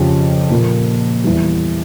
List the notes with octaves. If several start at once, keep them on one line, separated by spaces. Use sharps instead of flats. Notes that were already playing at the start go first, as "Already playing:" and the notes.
Already playing: F2 C#3 F3 C#4 G4
A#2 F3 A#3
E2 E3 G3